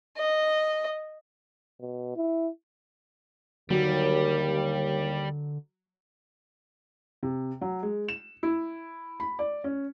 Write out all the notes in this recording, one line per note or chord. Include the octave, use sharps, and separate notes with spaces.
D#5
B2
E4
D#2 D3 F#3 G3
C3
F#3
G#3
E7
E4
B5
D5
C#4